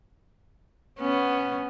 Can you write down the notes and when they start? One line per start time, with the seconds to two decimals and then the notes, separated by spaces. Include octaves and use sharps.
1.00 B3 C#4